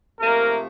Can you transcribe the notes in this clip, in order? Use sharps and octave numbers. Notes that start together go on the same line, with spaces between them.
C3 F3 A3 A#3 A#4